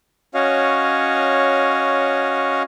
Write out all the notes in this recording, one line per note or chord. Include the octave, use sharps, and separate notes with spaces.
C#4 F#4 C#5 D#5 F5